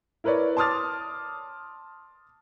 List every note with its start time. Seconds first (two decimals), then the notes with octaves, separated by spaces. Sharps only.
0.24 E4 A#4 B4 C#5 D5
0.57 A5 C6 D6 D#6 F6 A6